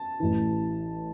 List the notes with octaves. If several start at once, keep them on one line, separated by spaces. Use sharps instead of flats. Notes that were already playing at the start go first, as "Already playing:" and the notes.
Already playing: A5
A1 A2 E3